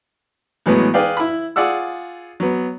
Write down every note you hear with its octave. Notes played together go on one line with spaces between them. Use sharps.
A2 E3 F#3 G#3 B3
G#4 B4 D5 F5 G5
E4 B5
F4 G#4 D5 F#5 E6
F#3 B3